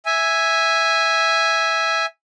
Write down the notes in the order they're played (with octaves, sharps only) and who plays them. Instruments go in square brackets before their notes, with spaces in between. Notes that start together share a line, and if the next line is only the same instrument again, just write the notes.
[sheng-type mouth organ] E5 G#5